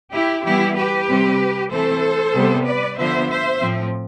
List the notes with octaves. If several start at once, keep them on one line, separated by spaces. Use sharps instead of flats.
E4 G4
E3 G3 B3 E4 G4
G4 B4
C3 G3 C4
E3 A3 C4 A4 C5
C3 G3 B3
B4 D5
D3 F3 B3 C5 E5
C5 E5
A2 F3 C4